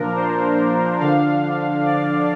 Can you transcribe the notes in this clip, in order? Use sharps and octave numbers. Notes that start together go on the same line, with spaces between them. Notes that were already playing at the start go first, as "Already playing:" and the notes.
Already playing: A#2 F3 D4 A#4
C5
D3 F3 D4 F5
D5